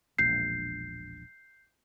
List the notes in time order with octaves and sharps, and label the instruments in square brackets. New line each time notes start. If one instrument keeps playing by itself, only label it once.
[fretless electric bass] E1 A#1 [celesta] G6 C7